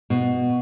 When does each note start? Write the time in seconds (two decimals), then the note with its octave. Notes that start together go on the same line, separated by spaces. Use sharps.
0.10 B2